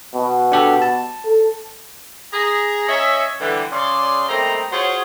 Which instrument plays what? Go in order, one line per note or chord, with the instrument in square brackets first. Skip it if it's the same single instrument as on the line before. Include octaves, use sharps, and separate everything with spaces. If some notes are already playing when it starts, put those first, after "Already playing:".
[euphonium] B2
[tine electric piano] D4 G4 A4
A5
[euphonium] A4
[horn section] G#4 A#5
C#4 C#5 D#5 E5
D3 E3 G3
C#3 D5 C6
G3 A3 A#3 C4 D#4 A#5
F4 F#4 G#4 C5 C#5